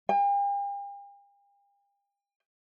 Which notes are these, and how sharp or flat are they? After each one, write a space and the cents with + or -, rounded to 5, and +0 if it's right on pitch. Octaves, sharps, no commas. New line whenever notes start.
G5 +45